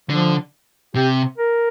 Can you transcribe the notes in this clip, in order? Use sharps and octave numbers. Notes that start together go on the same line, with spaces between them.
D3 F3
C3 G4
A#4